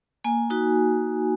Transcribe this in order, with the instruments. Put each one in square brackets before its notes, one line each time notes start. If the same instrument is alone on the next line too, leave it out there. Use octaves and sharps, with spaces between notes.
[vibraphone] A#3 G#5
D#4 F#4